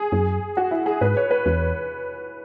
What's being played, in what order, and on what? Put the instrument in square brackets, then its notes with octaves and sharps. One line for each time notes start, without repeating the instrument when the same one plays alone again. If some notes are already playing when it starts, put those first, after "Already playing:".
Already playing: [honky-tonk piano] G#4
[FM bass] F#2
[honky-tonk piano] F#4
E4
G#4
[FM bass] G#2 [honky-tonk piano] B4
[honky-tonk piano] C#5
B4
[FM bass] E2